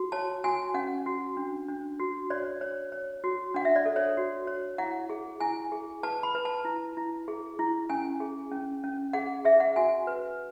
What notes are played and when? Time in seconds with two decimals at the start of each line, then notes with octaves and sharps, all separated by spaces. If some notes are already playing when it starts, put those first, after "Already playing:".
Already playing: F#4
0.12 C#5 A5
0.44 F#4 G#5
0.74 C#4 F#5
1.06 F#4
1.37 D4
1.68 D4
2.00 F#4
2.30 C#5 D5
2.61 C#5
2.92 C#5
3.24 F#4
3.54 D4 F#5
3.65 E5
3.76 D5
3.86 A4
3.96 C#5
4.17 F#4
4.47 C#5
4.78 E4 F#5
5.10 G#4
5.40 E4 G#5
5.72 G#4
6.03 B4 A5
6.23 B5
6.35 B4
6.45 A5
6.65 E4
6.97 E4
7.28 G#4
7.59 E4
7.90 C#4 G#5
8.20 G#4
8.52 C#4
8.84 C#4
9.13 G#4 F#5
9.45 G#4 E5
9.60 F#5
9.76 F#4 G#5
10.07 B4